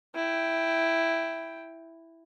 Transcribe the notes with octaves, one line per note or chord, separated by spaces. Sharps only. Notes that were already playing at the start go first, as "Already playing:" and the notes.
E4 G5